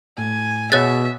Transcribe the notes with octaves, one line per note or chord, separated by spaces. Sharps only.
A2 G#5
B2 G#4 C#5 E5 F#5 F#6 A6